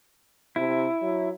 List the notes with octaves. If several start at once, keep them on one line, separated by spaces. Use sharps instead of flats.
C3 E4
F#3